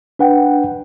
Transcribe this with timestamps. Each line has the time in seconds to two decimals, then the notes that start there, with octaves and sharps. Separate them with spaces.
0.19 D4 B4 F#5 G5